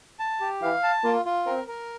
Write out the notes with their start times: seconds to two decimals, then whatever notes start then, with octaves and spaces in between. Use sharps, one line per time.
0.19 A5
0.41 G4
0.62 E3 F5
0.83 A5
1.04 A#3 F4
1.25 F4
1.46 C4 A#4
1.68 A#4